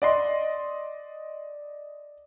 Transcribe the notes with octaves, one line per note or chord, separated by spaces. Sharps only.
D5 D#5 C6